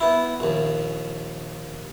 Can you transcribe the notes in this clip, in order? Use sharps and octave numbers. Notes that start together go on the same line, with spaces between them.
B3 E4
A#1 D#2